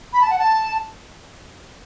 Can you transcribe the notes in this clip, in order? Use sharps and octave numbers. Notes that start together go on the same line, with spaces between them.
B5
A5
F#5
A5